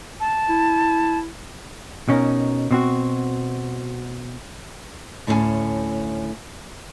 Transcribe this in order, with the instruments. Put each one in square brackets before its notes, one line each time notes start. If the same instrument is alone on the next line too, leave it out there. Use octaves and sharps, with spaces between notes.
[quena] A5
[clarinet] E4
[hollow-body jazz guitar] B2 C#4 D#4 A#4
B2 C4 F#4
[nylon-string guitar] D2 A2 C#4 E5 G#5